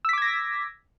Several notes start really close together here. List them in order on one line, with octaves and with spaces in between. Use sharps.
E6 B6 D6 G#6 A#6